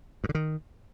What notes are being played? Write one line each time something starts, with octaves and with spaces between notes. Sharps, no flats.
G2
D3
D#3